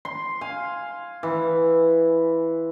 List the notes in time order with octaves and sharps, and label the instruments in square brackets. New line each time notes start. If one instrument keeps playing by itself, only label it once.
[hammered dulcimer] C6
F5 G#5
E3